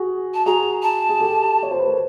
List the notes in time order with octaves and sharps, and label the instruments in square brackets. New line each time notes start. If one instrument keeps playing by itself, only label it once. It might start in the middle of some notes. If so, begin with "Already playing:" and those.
Already playing: [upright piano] F#4 G#4
[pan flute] A5
[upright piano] F#4 G#4 [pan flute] A#5
[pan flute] A5
[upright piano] G#4
G4 A4
C#5
C5
B4
A#4